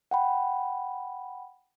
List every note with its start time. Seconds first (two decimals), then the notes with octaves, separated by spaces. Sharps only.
0.11 F#5 G5 B5